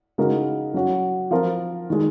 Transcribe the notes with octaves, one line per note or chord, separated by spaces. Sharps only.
C#3 G#3 D#4 F#4 A#4
F#3 C#4 F#4
F3 C4 F4 A#4
D#3 G#3